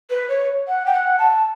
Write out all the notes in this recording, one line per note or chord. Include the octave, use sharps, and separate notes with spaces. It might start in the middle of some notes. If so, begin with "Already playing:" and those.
B4
C#5
F#5
G5
F#5
A5